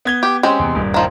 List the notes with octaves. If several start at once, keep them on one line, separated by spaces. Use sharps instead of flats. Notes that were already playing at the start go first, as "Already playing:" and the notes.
B3 G#6 G7
G4
G#3 C4 C#4 G4 C5
E2 C3
D#1 G2
D#3 F3 F4